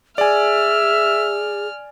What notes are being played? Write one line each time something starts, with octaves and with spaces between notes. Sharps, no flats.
G#4 D5 E5 G#5 F6